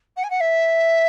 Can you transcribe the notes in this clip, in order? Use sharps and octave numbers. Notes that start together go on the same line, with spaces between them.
F#5
G#5
F#5
E5